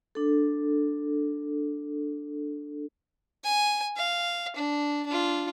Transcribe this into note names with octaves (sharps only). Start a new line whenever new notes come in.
D4 A4
G#5
F5
D4
D4 F4